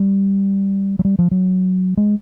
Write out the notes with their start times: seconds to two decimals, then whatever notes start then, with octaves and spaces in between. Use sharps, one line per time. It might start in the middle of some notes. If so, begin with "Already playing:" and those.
Already playing: G3
0.99 F#3
1.05 G3
1.19 F3
1.31 F#3
1.97 G#3